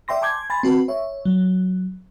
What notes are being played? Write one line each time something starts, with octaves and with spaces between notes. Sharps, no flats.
D5 E5 G5 C6 A#6
G#5 A5 C6 D6 G6 G#6
G#5 B5 C6 A6
C4 F#4 B4
C#5 E5
F#3